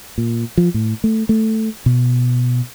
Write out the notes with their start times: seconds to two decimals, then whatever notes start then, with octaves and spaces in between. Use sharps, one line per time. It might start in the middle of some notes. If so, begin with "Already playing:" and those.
0.18 A#2
0.57 F3
0.74 A2
1.04 A3
1.29 A3
1.86 B2